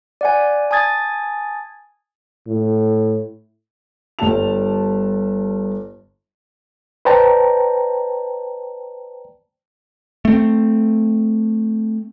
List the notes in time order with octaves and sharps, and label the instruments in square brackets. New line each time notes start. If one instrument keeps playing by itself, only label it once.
[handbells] D5 F#5 G#5
G#5 A5 D#6 G#6 A6
[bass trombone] A2
[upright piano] G1 G3 G4 A5 F7
[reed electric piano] B4 C5 D5 G5 A5 A#5
[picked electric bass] A3 C4